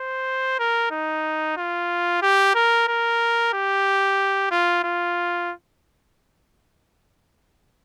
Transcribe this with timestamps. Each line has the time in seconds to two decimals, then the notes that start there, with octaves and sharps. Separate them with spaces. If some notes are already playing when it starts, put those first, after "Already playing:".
Already playing: C5
0.59 A#4
0.91 D#4
1.57 F4
2.22 G4
2.55 A#4
2.88 A#4
3.53 G4
4.51 F4
4.84 F4